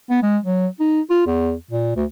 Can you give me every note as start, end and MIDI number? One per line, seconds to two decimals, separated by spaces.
0.10 0.20 59
0.22 0.37 56
0.44 0.67 54
0.80 1.00 63
1.10 1.22 65
1.27 1.53 40
1.71 1.95 46
1.96 2.04 38